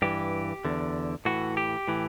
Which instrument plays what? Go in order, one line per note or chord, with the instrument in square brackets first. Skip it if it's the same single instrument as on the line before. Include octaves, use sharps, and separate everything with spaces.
[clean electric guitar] G2 E3 G4
E2 D3
A2 E3 F#4
G4
A2 E3